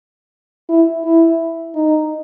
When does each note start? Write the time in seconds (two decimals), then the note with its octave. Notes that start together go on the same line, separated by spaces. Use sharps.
0.69 E4
1.05 E4
1.75 D#4